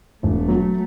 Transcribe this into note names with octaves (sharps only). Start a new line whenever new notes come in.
E1 A3
F#3